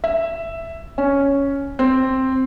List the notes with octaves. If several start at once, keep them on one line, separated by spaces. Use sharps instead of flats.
E5
C#4
C4